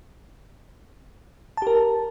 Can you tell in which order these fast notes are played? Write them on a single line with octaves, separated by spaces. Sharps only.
A5 G4 A#4